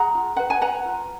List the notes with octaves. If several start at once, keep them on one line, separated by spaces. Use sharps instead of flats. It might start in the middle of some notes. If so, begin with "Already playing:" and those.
Already playing: G#4 F#5 A#5
F4
B4 F#5
G#5
B4 F#5 A#5
F4